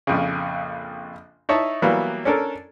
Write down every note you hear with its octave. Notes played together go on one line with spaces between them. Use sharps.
A#1 F2 C#3
D#4 E4 C#5 A5
E3 F#3 G3 A#3 B3
C#4 D4 A4 A#4